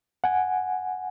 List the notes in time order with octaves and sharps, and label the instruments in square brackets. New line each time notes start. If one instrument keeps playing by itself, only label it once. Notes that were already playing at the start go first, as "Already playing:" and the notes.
[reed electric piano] F#5 G#5